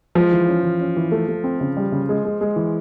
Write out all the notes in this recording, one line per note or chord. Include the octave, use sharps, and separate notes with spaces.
F3 G#3
E3
C#4
E3
C#4
E3
A3
A3
C4
C#3
G3
C#3
G#3
G#3
G#3
E3